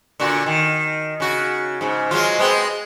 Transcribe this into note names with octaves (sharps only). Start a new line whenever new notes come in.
A#2 D3 F#4
D#3
C#3 F#4
G#2 C#3
F#3 G#3 F4
G#3 B3 C4